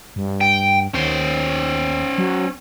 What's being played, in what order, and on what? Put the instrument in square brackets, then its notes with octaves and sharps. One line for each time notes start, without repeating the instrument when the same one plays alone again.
[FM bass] G2
[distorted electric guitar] G5
[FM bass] D#2 [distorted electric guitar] C#4 C5
[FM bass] F#3